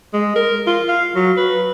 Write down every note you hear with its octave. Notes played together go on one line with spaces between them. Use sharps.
G#3
A#4
F4
F5
F#3
B4